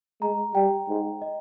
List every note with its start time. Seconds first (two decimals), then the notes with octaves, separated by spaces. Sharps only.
0.22 G#3 A#5
0.55 G3 G5
0.89 G#2
1.22 D#5